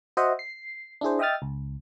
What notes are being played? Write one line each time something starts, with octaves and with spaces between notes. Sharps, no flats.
F#4 C5 D#5 E5 F#5
C7
D4 E4 G#4 C5
D#5 E5 G5 D#6 F6 A6
C#2